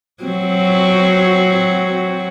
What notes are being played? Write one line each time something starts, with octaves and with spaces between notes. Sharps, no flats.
F#3 C4 F#4